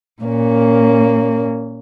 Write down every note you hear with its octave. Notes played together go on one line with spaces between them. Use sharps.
A#2 A#3 C#4